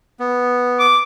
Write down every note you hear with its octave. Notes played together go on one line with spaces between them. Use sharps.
B3
D6